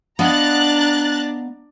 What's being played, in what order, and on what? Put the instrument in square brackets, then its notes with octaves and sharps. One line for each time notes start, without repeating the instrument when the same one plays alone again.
[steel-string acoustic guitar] B3 D#5 F5 [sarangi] D4 [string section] A#5 F#6 A6